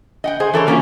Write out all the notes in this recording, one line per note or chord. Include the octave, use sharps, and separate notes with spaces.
D#5 F#5 G5
G#4 C5
E3 A4 A#4 C#5
F#3 A#3 B3 C#4 F4 F#4